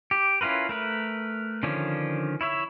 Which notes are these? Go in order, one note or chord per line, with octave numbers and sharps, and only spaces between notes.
G4
C#4 E4 F4 A#4 B4
A3 A#4 B4
D3 D#3 F3 C#4 D4
E4 C#5 E5